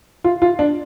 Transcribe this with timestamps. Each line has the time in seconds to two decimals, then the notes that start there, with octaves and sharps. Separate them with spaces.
0.24 F4
0.42 F4
0.59 D4